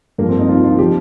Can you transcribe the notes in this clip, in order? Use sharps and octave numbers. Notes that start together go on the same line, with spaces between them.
G2 F3 A#3
C4
D#4
F4
F4
F3 G4